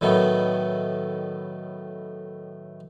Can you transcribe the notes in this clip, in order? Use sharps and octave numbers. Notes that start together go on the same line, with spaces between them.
A2 D#3 F#3 A3 B3